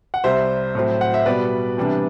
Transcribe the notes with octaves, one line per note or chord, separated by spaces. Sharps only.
F#5
C2 C3 G3 C5 E5
A2 F#3 C4
F#5
E5
B2 G3 B3 B4 D5
C3 E3 G3 B3 D4